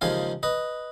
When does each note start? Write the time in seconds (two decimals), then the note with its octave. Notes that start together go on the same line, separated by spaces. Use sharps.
0.01 D#2 C#3 F3 G#3 F5 G#5
0.43 B4 D#5